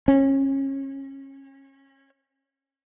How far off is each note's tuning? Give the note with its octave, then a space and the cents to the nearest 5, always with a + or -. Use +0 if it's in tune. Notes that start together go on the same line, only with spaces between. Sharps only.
C#4 -30